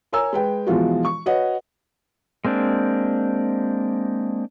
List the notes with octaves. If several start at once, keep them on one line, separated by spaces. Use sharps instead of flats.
A#4 C#5 G#5 A#5 E6
G#3 B4 G5
B2 E3 F3 G#3 F4 F#4
C#6
F#4 B4 C#5 D#5 F#5
G#3 A#3 C4 D4